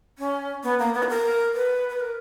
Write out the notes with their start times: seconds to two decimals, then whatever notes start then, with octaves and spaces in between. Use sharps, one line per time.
0.18 C#4
0.64 B3
0.79 A#3
0.94 B3
1.03 B4
1.09 A#4
1.54 B4
1.89 B4
2.00 A#4